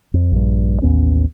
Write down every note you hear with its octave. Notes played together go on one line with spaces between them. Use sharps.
F2
A#1 G2
A1 D#2 B3 C#4